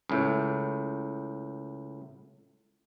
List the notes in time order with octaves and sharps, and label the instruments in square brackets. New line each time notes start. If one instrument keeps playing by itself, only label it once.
[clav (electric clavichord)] C#2 A2